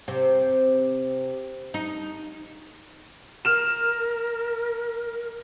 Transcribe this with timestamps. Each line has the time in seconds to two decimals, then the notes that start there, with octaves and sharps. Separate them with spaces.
0.08 C3
1.74 D#4
3.45 A#4 F6 E7